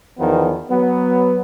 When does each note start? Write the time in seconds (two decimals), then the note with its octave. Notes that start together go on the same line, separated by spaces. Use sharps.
0.19 E2 D#3 F3 B3
0.70 F#3 B3